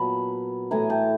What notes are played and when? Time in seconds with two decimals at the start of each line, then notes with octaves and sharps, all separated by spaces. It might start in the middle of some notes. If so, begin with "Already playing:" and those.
Already playing: A#2 F#3 B3 A5 B5
0.71 A2 E3 A3 G#5 A#5
0.90 G5 A5